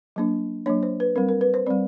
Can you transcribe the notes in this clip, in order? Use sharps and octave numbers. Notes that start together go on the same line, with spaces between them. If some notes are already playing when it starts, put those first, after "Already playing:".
F#3 A#3 D4
F#3 A#3 D4 C#5
C5
B4
G3 C4 A#4
A#4
B4
C5
G3 C4 D5